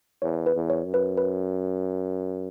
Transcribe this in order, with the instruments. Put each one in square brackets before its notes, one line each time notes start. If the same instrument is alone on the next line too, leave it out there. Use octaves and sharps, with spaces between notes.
[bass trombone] E2 [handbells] C#5
[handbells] B4
[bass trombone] E2
[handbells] C#5
[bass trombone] F#2
[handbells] B4
B4